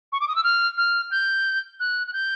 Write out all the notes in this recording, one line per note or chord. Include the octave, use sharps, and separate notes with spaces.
C#6
D6
D#6
E6
F6
F6
G6
F#6
F#6
G6